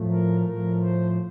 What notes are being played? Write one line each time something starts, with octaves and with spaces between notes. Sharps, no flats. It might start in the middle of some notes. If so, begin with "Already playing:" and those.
Already playing: A2 F3 A3
A#4
A2 F3 A3 A#4
C5